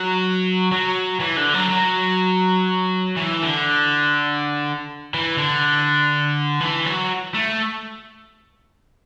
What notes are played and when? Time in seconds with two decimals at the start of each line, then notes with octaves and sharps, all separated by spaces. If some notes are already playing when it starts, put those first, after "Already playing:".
Already playing: F#3
0.72 F#3
1.20 E3
1.37 D3
1.54 F#3
1.70 F#3
3.16 E3
3.42 D3
5.14 E3
5.38 D3
6.61 E3
6.86 F#3
7.34 A3